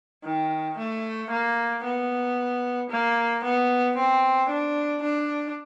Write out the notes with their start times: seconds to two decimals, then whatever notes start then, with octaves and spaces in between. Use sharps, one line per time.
0.24 D#3
0.77 A3
1.30 A#3
1.84 B3
2.90 A#3
3.44 B3
3.96 C4
4.49 D4
5.02 D4